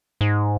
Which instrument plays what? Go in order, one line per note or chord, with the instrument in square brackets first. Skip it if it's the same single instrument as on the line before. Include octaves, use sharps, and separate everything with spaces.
[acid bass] G#2